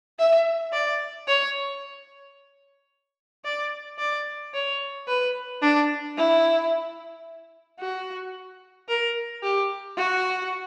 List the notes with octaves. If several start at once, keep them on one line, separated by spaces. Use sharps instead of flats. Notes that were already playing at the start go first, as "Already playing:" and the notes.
E5
D5
C#5
D5
D5
C#5
B4
D4
E4
F#4
A#4
G4
F#4